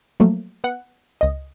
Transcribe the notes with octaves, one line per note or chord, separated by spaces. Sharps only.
F3 F#3 A3 A#3
B3 F#5
C#2 D#5